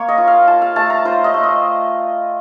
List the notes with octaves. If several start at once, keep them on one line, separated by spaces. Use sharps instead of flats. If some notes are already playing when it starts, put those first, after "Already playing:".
Already playing: A#3 C#5
D#5
F4
F5
F4 A5
F5
A3 A5
A#5
F4 C5
D#5
A3
D#5